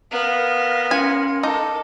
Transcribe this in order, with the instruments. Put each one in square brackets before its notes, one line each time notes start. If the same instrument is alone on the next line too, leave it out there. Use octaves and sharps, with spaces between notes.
[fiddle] B3 [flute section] A#4 F5 F6
[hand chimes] C#4 C6 C#7 [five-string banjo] G#5
[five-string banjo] D#4 [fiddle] A4 [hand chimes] A5 D6